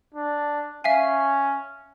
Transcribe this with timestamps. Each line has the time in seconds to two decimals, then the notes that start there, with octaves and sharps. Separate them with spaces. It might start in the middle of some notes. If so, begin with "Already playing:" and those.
0.14 D4
0.84 C#4 E5 F5 G#5